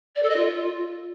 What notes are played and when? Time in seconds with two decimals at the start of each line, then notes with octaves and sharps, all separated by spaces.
0.15 D5
0.22 A4
0.29 D#5
0.36 F4